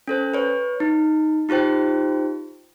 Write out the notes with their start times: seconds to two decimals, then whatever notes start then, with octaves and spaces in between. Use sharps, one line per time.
0.08 C#4 A4 C5
0.34 B4 C#5
0.80 D#4
1.49 D#4 F4 G4 C5 G5